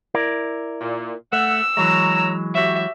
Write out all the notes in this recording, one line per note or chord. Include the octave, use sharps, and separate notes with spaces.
E4 A#4 D5
A#2
A3 E5 F#5 E6
E3 F#3 G#3 C#5 A#5
F#4 G4 C#5 E5